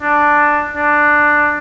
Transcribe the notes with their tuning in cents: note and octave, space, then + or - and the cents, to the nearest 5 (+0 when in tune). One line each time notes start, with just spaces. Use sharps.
D4 +5
D4 +10